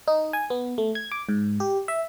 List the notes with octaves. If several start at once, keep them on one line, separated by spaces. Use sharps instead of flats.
D#4
G#5
B3
A3
G#6
D6
G#2
G4
E5